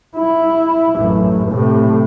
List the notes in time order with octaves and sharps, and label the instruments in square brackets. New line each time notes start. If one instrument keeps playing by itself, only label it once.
[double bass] E4
A1 F#2
A2 C3